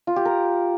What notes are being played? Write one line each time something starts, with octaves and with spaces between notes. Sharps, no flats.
F4
G4
A#4